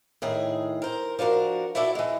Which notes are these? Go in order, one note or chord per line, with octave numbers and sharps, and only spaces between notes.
A2 D#3 G#4
A#4 C5
F3 D4 F#4 A#4
E4 F#4 A4 D5 E5
E3 G#3